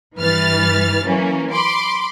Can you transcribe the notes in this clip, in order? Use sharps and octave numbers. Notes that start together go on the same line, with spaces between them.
G2 E3 B4 F6 A6
E3 F#3 A#3 C#4
B5 C6 D6